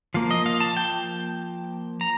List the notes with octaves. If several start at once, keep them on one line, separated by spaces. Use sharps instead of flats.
F3 A#3 F5
D#5
F5
A5
G5
A#5